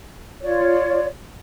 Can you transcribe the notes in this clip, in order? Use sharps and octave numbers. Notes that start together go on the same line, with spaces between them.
F4 C#5 D5